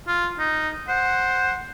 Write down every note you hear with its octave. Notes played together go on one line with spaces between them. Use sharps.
F4
D#4
C5 F#5